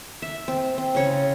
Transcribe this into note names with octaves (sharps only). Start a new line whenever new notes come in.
E5
C4
C4
C#3 C#5